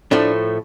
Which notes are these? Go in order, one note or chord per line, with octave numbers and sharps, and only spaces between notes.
A2 F3 A3 D4